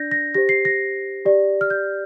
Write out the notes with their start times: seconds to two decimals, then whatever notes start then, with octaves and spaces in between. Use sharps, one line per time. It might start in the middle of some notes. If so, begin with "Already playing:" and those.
Already playing: D4 D5 G6 A#6
0.11 A#6
0.34 G4 C5 A#6
0.49 C7
0.65 A#6
1.25 G4 D5
1.61 F6
1.70 G6